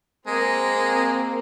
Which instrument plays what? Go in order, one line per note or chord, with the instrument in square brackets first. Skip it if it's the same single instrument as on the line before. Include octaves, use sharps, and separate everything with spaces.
[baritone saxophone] G#3 [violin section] A#3 C4